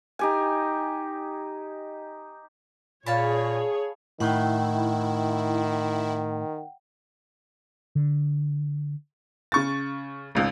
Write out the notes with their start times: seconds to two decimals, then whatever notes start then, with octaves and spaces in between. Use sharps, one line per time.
0.19 D#4 G4 G#5
3.06 A#2 G#4 C#5 F5 A5 B5
4.20 A2 D#3 E4 F#5 G5
7.96 D3
9.52 C#3 C#6 A6
10.35 G#1 C#2